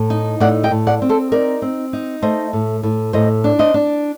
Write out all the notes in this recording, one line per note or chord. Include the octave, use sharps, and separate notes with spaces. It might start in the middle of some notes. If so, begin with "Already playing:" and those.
Already playing: A2
D#4
A2 D5 F#5
D#5 G5
A2
D5 F#5
C4
A4 C5
D#4 A#4 D5
C4
D#4
A3 C5 D#5
A2
A2
A2 C5 D#5
D4
C5 D#5
D4